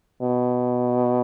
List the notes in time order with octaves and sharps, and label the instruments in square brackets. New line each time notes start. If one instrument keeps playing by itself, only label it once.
[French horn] B2